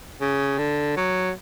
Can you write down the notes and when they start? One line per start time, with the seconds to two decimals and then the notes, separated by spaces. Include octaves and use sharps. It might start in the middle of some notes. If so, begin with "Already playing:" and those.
0.21 C#3
0.58 D3
0.97 F#3